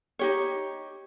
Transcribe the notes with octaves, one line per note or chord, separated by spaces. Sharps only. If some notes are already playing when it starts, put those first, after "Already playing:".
D#4 G4 C#5